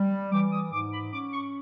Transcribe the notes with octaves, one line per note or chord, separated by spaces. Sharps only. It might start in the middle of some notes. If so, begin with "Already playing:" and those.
Already playing: G3
E3 D6
D#6
G#2 D6
B5
C#4 D6
C#6